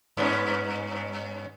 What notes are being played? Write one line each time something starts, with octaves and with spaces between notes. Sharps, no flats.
G2 B3 C#4